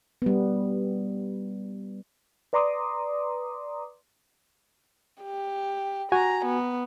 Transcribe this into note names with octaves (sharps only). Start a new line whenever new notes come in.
G3 B3
B4 D5 A#5 C6 D6 D#6
G4
F#4 G#5 A#5
B3